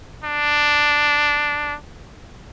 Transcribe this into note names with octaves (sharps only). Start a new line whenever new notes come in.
D4